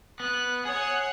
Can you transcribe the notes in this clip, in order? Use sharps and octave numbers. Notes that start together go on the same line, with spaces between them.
B3 F#6
G#4 C#5 F#5